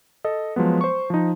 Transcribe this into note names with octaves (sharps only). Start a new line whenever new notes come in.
A4 D#5
F3 F#3 G#3 B3
C5 C#6
F3 D#4